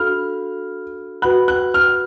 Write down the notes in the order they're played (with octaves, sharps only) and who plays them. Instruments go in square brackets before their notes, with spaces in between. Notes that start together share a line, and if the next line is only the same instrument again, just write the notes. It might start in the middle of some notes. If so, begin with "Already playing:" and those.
Already playing: [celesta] D4 F#4 A4 F5 B5 [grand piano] F6
[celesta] F#4 B4 F#5 B5 [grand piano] F#6
[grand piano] F#6
F6